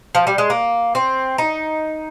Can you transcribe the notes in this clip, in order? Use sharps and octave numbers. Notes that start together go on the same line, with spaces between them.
F3
G3
G#3
A#3
C4
D#4